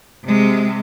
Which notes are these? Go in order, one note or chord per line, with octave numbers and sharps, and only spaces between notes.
C3 G#3